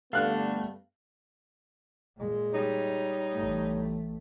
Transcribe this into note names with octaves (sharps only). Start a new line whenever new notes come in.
G2 D3 A3 B3 F5 F#6
A#2 G#3
G3 D#4 C#5
A1 A3